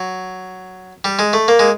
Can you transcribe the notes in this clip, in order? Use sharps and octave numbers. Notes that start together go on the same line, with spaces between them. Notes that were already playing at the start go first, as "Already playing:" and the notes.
Already playing: F#3
G3
G#3
A3
A#3
G#3